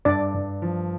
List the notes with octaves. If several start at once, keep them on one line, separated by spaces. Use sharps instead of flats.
G2 D4 D5
G2
F3